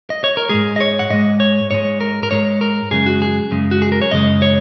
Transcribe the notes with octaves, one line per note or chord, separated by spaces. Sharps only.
D#5
C#5
A#4
G#2 G#3 G#4
D#5
C#5
F#5
G#2 G#3 D#5
C#5
G#2 G#3 C#5
A#4
A#4
G#2 G#3 C#5
A#4
F#2 C#3 G#3 G#4
F#4
G#4
F#2 C#3 G#3
F#4
G#4
A#4
C#5
F#2 C#3 G#3 D#5
C#5